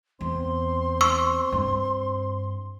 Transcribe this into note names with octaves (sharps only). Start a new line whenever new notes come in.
E2 C4 C6
C#6 E6
G2